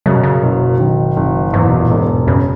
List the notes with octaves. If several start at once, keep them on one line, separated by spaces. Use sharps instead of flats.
F#2 C#3
B2
C#3
F#1 B2
D#3
F#1
E2 G#2
B2
A#2
E1 G#2
F#2 C#3